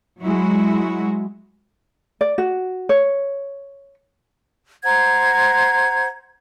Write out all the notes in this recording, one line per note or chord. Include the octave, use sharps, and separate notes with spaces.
F#3 G#3 E4 F#4
D5
F#4
C#5
C5 F#5 A#5 G#6